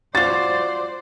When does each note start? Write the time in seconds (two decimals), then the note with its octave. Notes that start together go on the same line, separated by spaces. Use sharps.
0.15 F4 F#4 C5 D5 A6